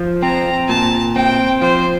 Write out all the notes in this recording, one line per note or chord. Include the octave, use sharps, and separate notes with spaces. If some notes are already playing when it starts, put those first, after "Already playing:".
Already playing: F3
C4 A#5
A#2 A5
C4 G5
F3 C5